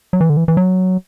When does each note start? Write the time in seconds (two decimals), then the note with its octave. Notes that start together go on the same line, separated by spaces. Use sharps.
0.13 F#3
0.21 E3
0.30 D3
0.37 E3
0.48 E3
0.57 F#3